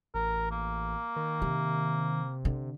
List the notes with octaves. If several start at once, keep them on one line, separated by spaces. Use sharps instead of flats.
A1 A#4
A#3
D#3
C3 D#3
D3